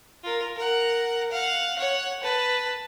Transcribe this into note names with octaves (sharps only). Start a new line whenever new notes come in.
F4 A#4
A#4 F#5
F5 F#5
C#5 F#5
B4 A5